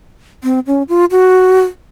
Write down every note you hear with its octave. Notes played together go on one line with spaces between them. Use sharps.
C4
C#4
F4
F#4